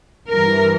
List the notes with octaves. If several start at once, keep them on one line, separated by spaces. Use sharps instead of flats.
G2 E3 A#4